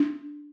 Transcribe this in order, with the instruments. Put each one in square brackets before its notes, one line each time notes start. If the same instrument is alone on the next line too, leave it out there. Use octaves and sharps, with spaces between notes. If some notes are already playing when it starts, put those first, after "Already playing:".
Already playing: [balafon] D4